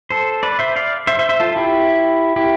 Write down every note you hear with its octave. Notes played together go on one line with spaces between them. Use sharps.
A4 C5
B4 D5
C5 E5
D5 F5
C5 E5
C5 E5
C5 E5
F4 A4
E4 G4
E4 G4